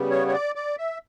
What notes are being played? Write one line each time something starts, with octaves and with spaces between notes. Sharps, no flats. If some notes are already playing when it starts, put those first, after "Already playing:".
Already playing: C#3 G3 B3
C#5
C#5
D5
D5
E5